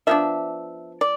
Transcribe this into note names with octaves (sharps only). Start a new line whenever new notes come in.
F3 B3 D4 E5
D5